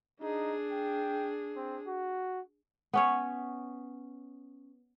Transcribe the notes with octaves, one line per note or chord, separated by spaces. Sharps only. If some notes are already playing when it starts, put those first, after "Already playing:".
D4 D#4 G#4
G5
C4
F#4
B3 C#4 C#5